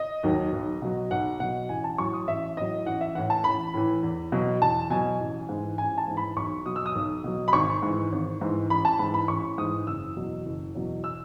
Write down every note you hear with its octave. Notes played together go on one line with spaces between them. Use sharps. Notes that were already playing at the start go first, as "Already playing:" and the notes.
Already playing: D#5
D#2 D#3 F#3
B1
B2 F#3
B1 F#5
B2 F#3 F#5
A1 G#5
A5
A2 F#3 C#6
D#6
A1 E5
A2 F#3 D#5
A1 F#5
E5
A2 E3 F#5
A5
A1 B5
A2 E3
E2
B2 F#3
E2 A5
B2 F#3 G#5
A1
G#2 E3
A1 G#5
A5
G#2 E3
B5
B1 C#6
B2 F#3 D#6
E6
D#6
B1
B2 F#3
B5
G#1 C#6
G#2 E3
G#1
G#2 E3
A1 B5
A5
G#2 E3 B5
B5
A1 C#6
G#2 E3 D#6
F#1 E6
E2 B2 F#3
F#1
E2 B2 F#3
E6